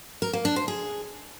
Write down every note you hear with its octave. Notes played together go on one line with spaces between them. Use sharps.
A#4
A#3
D4
C5
G#4